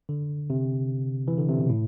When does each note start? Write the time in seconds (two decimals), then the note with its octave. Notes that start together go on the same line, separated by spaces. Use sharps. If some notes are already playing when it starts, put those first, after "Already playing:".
0.09 D3
0.50 C3
1.28 E3
1.38 D3
1.49 C3
1.59 B2
1.69 A2